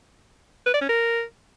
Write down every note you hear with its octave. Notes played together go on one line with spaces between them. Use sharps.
B4
D5
C#4
A#4